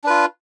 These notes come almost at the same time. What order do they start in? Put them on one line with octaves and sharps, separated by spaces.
D4 B4 F4